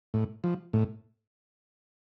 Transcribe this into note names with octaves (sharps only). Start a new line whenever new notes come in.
A2
F3
A2